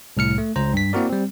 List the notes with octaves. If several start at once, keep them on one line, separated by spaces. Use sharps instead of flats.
C2 A2 F6 C#7
A3
C#2 C5 A#5
G2 B6
A#3 C4 E4 F#4 A#4 D5
G3 C4